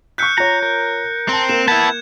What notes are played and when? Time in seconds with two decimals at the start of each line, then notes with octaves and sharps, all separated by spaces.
0.18 C#6 E6 F#6 G6 B6 C#7
0.38 F4 C#5 A#5
0.62 A#4
1.29 C4 A5 A#5
1.49 A#3 E7
1.68 B3 E4 A5 G#6